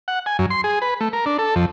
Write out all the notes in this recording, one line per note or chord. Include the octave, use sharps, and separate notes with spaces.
F#5
G#5
F#2
C6
G#4
B4
A3
A#4
D4
A4
F2